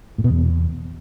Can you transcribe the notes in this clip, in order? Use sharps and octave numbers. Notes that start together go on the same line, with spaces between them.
A2
B2
E2